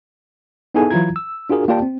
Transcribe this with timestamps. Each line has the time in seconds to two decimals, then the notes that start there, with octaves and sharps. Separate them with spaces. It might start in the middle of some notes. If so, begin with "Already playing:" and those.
0.75 B3 D#4 E4 G#4 A4 G#5
0.91 E3 F#3 E4 F4 A#5 G#6
1.16 E6
1.50 D4 F4 F#4 G#4 A#4
1.68 A#3 F4 G4 D5 G5 A5
1.82 C4